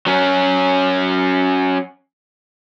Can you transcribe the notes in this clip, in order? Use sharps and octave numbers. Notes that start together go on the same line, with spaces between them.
F#3 C#4